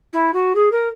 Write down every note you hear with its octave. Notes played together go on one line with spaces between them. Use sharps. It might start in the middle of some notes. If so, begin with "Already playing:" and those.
E4
F#4
G#4
A#4